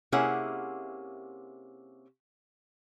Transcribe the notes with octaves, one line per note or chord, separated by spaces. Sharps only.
C3 A#3 C#4 E4 G#4 F#5